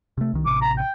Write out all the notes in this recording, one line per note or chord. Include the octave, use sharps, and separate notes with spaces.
C3 A3
C2 D#3
A1 C3 D6
A#5
G5